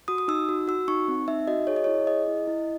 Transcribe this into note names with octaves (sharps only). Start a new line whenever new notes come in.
F#4 D#6
D#6
D#4 E6
F#4
F#4 E6
D#4 C#6
C4
D#4 E5
F#4 D#5
G#4 C#5
D#5
E4 C#5
G#4 D#5
E4
E4